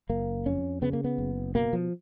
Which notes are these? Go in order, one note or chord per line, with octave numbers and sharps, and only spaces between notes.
F#1 A#3
F2 C#4
C#3 B3
A#3
B3
F#1
B2 A#3
F3